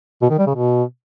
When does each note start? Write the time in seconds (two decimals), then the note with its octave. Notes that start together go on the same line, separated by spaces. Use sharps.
0.22 B2
0.30 D#3
0.38 G3
0.47 C#3
0.55 B2